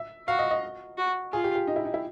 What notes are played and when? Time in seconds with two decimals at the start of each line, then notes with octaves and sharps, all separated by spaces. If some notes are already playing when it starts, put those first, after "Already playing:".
Already playing: E5
0.28 F#4 F5
0.39 D#5
0.51 D#5
0.98 F#4
1.32 F4 G#4
1.44 G4
1.55 G4
1.67 D#4
1.76 E4
1.85 D#4
1.94 E4